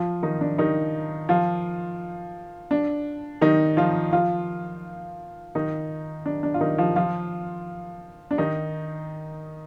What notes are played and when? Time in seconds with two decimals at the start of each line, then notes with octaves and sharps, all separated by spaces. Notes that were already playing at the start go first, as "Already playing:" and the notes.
Already playing: F3 F4
0.23 D#3 D#4
0.41 D4
0.58 D#3 D#4
1.29 F3 F4
2.71 D4
3.41 D#3 D#4
3.77 F3 F4
4.12 F3 F4
5.55 D#3 D#4
6.26 D4
6.43 D4
6.54 F4
6.61 D#3 D#4
6.78 F3 F4
6.96 F3 F4
8.31 D4
8.38 D#3 D#4